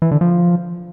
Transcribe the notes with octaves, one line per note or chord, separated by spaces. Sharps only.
E3
D3
F3